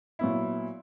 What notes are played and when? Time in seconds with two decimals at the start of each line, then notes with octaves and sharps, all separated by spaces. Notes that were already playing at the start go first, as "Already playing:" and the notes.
0.19 A#2 F#3 B3 E4